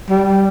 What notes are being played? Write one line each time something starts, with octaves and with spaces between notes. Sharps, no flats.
G3